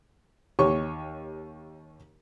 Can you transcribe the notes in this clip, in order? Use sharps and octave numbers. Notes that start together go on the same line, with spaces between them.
D#2 G4 C#5 C#6